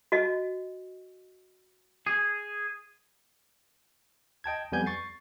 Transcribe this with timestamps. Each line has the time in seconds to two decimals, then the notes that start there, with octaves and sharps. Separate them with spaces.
0.12 F#4 D#5
2.07 G#4
4.44 D#5 G5 A5 G#6
4.72 F2 G3 B3 G#5 G6 G#6
4.86 C#6 A6 C7